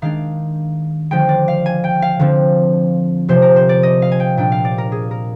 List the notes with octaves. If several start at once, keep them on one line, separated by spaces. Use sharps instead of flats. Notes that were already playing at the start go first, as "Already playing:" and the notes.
D#3 G#3 D4 F5
D3 F3 G#3 G5
D5
F5
G#5
G5
F5
D3 F3 C4
C3 F3 C4 C5
A#4
C5
D5
D#5
F5
G#5
G5
A#2 G3 D4 G5
F5
D5
A#4
G#4
A#4